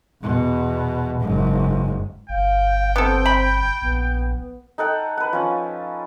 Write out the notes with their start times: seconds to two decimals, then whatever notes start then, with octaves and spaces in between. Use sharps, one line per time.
0.23 E2 B2
1.21 F#1 G#2
2.29 G1 F5 G5
2.96 B3 C4 A4
3.26 B5
3.82 A#1 B3
4.78 D#4 A4 F#5 G5
5.17 B4 F#5
5.33 F3 C#4